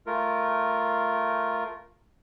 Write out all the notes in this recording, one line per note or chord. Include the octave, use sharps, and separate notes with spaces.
A3 F4 A#4